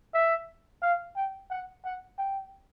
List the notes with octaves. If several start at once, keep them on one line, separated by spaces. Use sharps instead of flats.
E5
F5
G5
F#5
F#5
G5